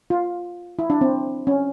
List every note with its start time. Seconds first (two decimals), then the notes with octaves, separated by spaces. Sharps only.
0.10 F4
0.79 E4
0.90 D4
1.01 C4
1.47 C#4